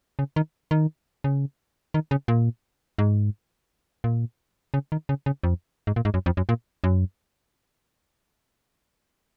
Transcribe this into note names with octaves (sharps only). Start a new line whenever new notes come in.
C#3
D#3
D#3
C#3
D#3
C#3
A#2
G#2
A#2
C#3
D#3
C#3
C#3
F2
G#2
A#2
G#2
F#2
F2
F#2
A#2
F#2